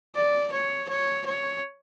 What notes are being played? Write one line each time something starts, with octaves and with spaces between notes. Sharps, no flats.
D5
C#5
C#5
C#5